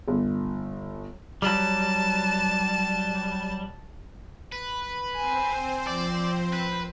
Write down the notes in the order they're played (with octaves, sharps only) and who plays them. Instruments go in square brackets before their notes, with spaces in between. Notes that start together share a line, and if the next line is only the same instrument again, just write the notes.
[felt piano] G1
[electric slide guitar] F#3 G3 [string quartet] A5
[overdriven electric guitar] B4
[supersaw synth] C4 C5 [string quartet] G#5
[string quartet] F3 [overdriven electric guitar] D5
[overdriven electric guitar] B4